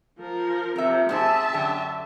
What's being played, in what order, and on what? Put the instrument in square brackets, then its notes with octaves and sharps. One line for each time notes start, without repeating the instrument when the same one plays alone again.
[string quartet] F3 A#4
[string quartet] C3 F3 [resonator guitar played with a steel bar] A#4 E5
[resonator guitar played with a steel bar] G#2 C3 G#4 [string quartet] E5 A5
[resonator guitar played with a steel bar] F#2 D3 G4